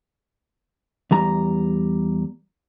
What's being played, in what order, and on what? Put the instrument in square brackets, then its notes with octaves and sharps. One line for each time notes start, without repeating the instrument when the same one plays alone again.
[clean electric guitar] E2 G3 A#5